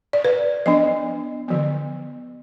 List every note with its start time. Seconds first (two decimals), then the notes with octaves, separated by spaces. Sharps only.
0.13 D5
0.24 B4
0.66 F3 B3 D4 D#5
1.48 D3 F3 B3